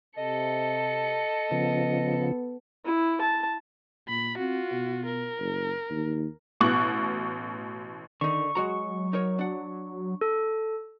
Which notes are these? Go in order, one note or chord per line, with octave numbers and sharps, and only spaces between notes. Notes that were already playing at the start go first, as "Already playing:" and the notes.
C3 A4 D#5 C#7
C#3 F3 B3
E4
A5
A#2 B5
C4 F4 F#4
B2
A#4
F#1
D#2
A1 B2 C#6 F#6 F#7
D3 D#3 D#4 C#6
F#3 G#3 F#4 A#5
D#4 A#4 C#5
D4 F#5
A4